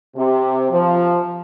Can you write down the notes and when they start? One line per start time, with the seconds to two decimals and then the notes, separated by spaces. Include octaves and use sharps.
0.16 C3
0.71 F3